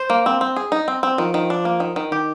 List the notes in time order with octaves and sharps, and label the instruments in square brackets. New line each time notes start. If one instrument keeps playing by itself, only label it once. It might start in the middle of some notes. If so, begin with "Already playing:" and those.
Already playing: [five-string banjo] C5
A#3
C4
C4
G#4
D#4
C4
C4
[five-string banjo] D#3 [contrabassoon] F3
[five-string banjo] D#3
D4
A#3
D#3
D#3
[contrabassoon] D#3 [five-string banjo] G4